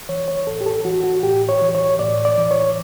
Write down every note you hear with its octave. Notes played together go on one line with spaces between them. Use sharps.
E3 C#5
C#5
A2 A4
G4
A4
E3 F#4
F#4
A2 G4
C#5
E3
C#5
A2 D5
D5
E3
C#5